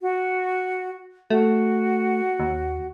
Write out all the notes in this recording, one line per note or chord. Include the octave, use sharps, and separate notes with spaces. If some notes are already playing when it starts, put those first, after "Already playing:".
F#4
A3 F#4
D#2